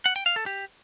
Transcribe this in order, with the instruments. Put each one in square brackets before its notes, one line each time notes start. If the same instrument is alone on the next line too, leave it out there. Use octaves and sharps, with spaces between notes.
[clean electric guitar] F#5
G5
F5
A4
G4